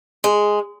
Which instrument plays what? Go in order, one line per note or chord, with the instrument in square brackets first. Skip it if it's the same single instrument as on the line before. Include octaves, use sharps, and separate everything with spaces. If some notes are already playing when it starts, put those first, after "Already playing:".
[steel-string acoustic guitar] G#3